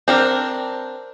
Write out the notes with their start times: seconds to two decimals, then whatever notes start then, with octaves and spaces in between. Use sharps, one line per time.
0.08 C4 D4 A#4